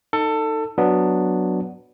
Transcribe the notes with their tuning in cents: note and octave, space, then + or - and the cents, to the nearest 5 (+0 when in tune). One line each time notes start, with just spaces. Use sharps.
D#4 +0 A4 +20
F#3 +0 B3 +0 D4 +0